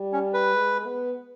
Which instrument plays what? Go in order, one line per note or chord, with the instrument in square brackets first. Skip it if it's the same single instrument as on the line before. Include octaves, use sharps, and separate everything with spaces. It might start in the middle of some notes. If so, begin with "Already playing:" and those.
Already playing: [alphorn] G3
[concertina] C#4
B4
[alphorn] G#3
B3